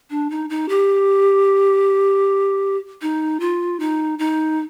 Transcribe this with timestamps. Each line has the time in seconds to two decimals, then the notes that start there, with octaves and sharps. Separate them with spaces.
0.10 D4
0.30 D#4
0.50 D#4
0.69 G4
3.02 D#4
3.40 F4
3.80 D#4
4.19 D#4